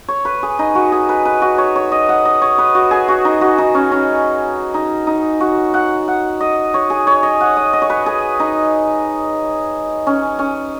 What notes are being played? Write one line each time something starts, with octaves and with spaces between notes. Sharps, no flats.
C#5
B4
G#4
D#4
F#4
G#4
B4
B4
F#4
C#5
C#5
D#5
F#5
D#5
C#5
B4
F#4
G#4
F#4
D#4
F#4
D#4
C#4
C#4
D#4
D#4
F#4
F#5
F#5
D#5
C#5
G#4
C#5
D#5
F#5
D#5
D#5
C#5
B4
G#4
D#4
C#4
C#4